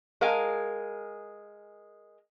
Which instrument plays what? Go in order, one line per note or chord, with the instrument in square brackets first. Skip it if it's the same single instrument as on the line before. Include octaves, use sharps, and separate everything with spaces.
[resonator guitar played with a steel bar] G#3 A#4 F5 G#5